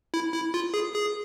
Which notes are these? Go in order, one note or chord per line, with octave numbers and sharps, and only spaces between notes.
E4
E4
F4
G#4
G#4